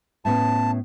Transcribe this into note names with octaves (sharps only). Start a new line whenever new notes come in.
A2 B3 C#4 A5